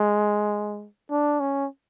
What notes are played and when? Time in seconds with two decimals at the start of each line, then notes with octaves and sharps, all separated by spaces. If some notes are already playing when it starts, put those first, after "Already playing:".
Already playing: G#3
1.10 D4
1.40 C#4